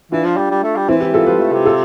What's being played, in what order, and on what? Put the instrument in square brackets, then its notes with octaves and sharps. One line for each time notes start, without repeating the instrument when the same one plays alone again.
[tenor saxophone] E3 [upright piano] D4 F4
[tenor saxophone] F3
G3
G3
A3
G3
[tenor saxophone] E3 [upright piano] C4 E4
[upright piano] E4 G4
F4 A4
[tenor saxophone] F3 [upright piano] G4 B4
[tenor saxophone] A3
C3
[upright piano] F4 A4